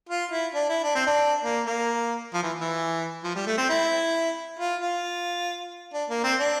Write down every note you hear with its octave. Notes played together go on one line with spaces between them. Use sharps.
F4
E4
D4
E4
D4
C4
D4
A#3
A#3
F3
E3
E3
F3
G3
A3
C4
E4
F4
F4
D4
A#3
C4
D4